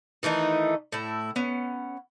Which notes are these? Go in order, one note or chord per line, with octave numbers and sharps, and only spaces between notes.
D#3 E3 A3 D#4
A2 E4
B3 C#4